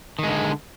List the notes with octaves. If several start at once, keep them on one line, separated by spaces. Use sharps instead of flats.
D3 D#3 G#3